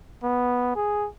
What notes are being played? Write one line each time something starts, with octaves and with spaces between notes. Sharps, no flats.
B3
G#4